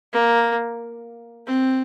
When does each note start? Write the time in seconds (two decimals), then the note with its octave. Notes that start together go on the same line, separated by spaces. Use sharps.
0.13 A#3
1.46 C4